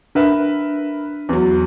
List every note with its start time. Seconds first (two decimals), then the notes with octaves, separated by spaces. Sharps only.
0.15 D4 A#4 B4 E5
1.29 E2 F#3